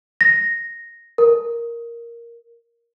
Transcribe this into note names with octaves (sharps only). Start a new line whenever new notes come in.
A#6
A#4